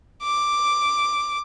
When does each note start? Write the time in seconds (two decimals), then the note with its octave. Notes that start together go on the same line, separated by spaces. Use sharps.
0.23 D6